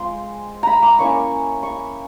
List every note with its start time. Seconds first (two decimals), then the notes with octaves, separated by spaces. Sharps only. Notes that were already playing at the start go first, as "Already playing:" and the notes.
Already playing: G#3 C4 F4 C6
0.63 A#5 B5
0.82 D6
0.99 A#3 C#4 E4 C#6
1.63 C#6